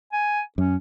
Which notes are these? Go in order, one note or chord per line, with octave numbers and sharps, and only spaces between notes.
G#5
F#2 C#4